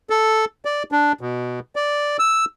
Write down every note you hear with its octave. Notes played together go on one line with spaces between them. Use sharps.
A4
D5
D4
B2
D5
E6